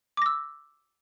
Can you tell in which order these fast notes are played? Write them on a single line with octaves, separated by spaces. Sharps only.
D6 A#6 E6